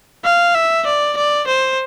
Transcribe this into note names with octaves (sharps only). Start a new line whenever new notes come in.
F5
E5
D5
D5
C5